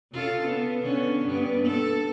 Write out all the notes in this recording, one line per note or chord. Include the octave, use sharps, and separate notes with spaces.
C#3 F4 A4
B3
D3 B3 C#4
G2 B3
A4